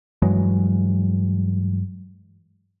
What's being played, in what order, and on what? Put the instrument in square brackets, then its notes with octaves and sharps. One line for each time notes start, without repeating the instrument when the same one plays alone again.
[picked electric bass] G2 E3 F#3 G#3